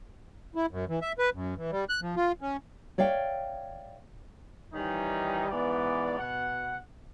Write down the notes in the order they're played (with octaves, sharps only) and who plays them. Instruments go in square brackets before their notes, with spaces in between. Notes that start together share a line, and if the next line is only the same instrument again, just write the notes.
[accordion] E4
F#2
E3
E5
B4
F#2
E3
G3
F#6
F3
F4
C#4
[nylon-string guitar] C#5 D5 E5 F5 G5
[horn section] D#3 E3 G3 C#4 D#4
G#2 E3 B3 D5
B2 F#5